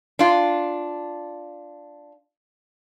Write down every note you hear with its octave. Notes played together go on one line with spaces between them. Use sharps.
D4 F4